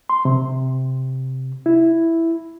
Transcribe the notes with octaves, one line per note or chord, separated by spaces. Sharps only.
C6
C3
E4